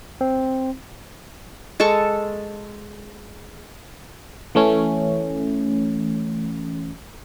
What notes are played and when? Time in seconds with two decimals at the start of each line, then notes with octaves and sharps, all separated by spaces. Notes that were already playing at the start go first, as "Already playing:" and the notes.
0.21 C4
1.80 G#3 A4 A5 C#6
4.55 E3 A3 C#4